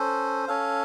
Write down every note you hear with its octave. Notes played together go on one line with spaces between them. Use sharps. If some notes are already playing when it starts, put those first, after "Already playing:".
Already playing: C#4 A4 C5
C#4 A4 C#5 F5